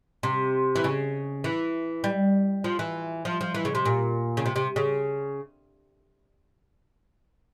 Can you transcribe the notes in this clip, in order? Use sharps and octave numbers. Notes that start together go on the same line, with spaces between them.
C3
E3
C#3
E3
G3
F3
E3
F3
F3
E3
C#3
C3
A#2
C#3
C3
C3
C#3